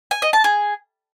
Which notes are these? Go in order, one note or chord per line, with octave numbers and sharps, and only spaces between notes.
G#5
D#5
A5
G#4